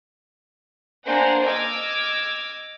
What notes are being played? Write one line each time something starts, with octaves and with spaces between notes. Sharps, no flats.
A#3 D4 C5 F#5 G#5 A#5
D#5 D6 E6 F6 G#6